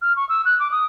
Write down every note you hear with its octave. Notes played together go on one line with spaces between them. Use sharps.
F6
C#6
E6
F#6
D6
D#6